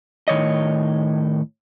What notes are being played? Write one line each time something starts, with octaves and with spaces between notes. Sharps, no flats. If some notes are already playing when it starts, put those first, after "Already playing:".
A2 D#3 C#5 D#5